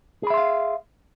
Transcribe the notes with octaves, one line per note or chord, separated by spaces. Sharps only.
G#4 E5 F5 B5 C6